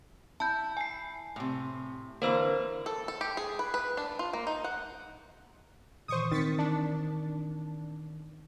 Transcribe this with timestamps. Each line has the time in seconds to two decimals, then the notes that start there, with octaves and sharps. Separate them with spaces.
0.40 E4 A5 G6
0.77 G#5 C7
1.36 A2 C3
2.22 D3 E3 A#3 A#4 C5 E6
2.86 A4
3.08 A4
3.21 G4
3.37 G#4
3.59 B4
3.74 B4
3.97 D4
4.19 F4
4.33 A#3
4.47 D#4
4.64 F#5
6.08 A#2 D#3 E3 C5 C#6 D#6
6.32 D#3 C4 A6 B6 C#7
6.59 D4